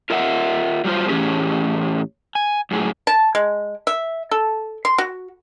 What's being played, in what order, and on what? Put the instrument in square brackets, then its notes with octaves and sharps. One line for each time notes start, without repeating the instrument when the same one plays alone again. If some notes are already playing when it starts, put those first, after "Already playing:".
[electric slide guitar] F4 A#4 D#5 E5 F#5
F#3 G3 A3 F4 C5
A2 E3 A#3 C#4 G4 G#4
G#5
F#2 A2 G#4
[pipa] A5
G#3
E5
A4
C6
F#4